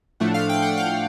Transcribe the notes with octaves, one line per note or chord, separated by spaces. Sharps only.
A2 F3 A3 D4 F#5
F5
G5
F#5
F5